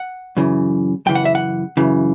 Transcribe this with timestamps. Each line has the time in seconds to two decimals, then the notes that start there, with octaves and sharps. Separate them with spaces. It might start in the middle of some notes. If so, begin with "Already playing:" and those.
Already playing: F#5
0.37 F#2 C#3 E3
1.06 F#2 C#3 E3 G5
1.15 F#5
1.25 E5
1.35 F#5
1.77 F#2 C#3 E3